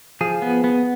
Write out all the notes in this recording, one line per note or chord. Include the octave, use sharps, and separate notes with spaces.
F3 G#4
B3
B3